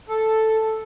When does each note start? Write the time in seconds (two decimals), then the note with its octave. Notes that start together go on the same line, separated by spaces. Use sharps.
0.09 A4